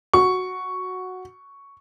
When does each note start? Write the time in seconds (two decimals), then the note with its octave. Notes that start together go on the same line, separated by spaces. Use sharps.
0.13 F#4 C#6